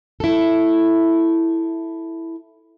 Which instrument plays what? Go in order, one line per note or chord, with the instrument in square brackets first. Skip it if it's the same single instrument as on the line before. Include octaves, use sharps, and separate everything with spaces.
[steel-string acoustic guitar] E4 A4